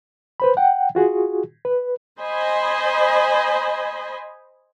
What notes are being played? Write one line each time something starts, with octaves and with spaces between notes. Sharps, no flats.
B4 C5 B5
F#5 G5
F4 F#4 G#4
B4
C5 D#5 G#5 B5